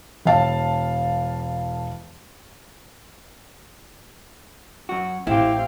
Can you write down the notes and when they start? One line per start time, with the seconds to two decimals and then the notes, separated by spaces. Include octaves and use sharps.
0.25 E1 F5 A5
4.89 F#2 F#4
5.27 A1 C4 E4 G4 F5